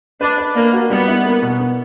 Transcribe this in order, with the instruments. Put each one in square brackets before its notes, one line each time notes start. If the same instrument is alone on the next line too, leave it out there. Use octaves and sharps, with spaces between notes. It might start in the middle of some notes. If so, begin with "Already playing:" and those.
[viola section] D4 [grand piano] B4
[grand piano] B4
[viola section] A#3 [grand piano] D5
[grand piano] F#4
[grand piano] G3 [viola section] B3
[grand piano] E4
A#3
B2
B3